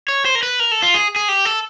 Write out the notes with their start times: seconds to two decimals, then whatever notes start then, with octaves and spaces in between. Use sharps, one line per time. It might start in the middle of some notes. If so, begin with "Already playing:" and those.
0.08 C#5
0.25 C5
0.35 A#4
0.43 B4
0.60 A#4
0.71 A4
0.82 F4
0.94 G#4
1.16 G#4
1.29 G4
1.45 A4